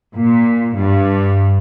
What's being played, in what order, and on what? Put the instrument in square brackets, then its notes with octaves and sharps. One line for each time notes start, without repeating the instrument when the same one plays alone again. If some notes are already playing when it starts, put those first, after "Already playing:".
[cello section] A#2
G2